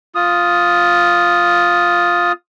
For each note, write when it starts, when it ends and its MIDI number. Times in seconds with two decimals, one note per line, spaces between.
0.15 2.32 65
0.15 2.32 87